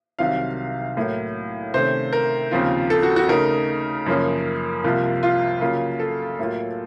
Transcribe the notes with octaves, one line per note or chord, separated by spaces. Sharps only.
C2 C3 D#3 F#3 C4 F5
A2 F#3 A#3
C3 D#3 A3 C#4 C5
A#4
D#2 C#3 F3 C4 F4
A4
F#4
F#4
C#3 A3 D#4 A#4
F#2 C#3 F3 A#3 C#4
C2 C3 F3 A#3 F4
F4
C#3 F#3 A#3 F4
A4
A2 F#3 A#3 F4